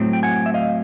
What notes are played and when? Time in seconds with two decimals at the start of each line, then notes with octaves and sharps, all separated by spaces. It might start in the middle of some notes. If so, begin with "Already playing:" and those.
Already playing: A2 F#3 A3 C4
0.13 G5
0.23 F#5 G#5
0.46 E5
0.54 D#5 F5